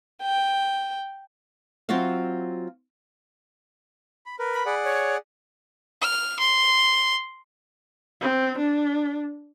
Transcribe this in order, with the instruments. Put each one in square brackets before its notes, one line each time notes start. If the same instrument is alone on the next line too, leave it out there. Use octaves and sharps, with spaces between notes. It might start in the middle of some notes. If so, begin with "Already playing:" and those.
[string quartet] G5
[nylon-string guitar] F#3 C4 F4 F#4 E5 F5
[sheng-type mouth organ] B5
A#4 B4
[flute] B5
[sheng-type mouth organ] G#4 D5 F#5
[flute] C#5
[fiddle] F6
C6
[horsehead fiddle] C4
D4